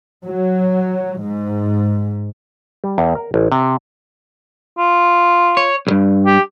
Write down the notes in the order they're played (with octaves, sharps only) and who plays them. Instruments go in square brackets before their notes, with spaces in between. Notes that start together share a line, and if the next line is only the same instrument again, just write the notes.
[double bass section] F#3
G#2
[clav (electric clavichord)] G3
E2
A#4
A1
C3
[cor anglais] F4
[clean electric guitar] C#5
B1 G2
[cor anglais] G4